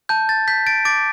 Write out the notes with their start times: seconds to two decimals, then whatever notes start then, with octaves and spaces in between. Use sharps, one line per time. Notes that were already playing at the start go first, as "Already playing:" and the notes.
0.09 A5 G6
0.29 A6
0.48 G6 B6
0.67 A6 D7
0.85 D6 A6 D7